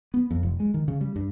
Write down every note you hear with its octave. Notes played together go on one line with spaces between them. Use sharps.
B3
F2
F1
G#3
D#3
C#3
G3
G2